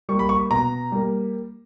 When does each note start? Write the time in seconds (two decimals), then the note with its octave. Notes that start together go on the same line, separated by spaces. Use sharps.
0.09 G3 A#3 C#6
0.19 B5
0.29 C#6
0.51 B2 A#5
0.92 G3 A#3